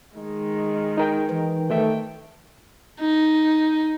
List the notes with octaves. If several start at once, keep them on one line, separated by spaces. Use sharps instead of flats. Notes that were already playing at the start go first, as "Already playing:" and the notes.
D#3 G#3
D#4 A#4 G5
E3
D#3 A3 E5 G5
D#4